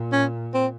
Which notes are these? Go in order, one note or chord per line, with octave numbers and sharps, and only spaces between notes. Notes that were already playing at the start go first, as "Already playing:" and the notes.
Already playing: A#2
C#4
C4